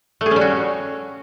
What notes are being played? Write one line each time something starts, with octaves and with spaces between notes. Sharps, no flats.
A3
G#4
C#4
G3
F#4